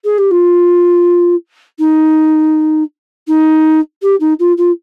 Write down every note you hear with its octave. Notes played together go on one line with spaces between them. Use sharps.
G#4
G4
F4
D#4
D#4
G4
D#4
F4
F4